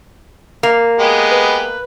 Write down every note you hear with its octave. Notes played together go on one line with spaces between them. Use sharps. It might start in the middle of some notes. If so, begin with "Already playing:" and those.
A#3
G#3 B3 G4
B4